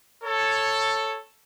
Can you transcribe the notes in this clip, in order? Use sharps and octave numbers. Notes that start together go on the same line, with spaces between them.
A4 C#5